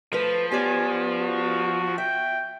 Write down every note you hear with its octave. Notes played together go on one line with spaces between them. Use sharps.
F3 A3 B4
B3 C#4 G4 D5 G#5
F#4
E5 G5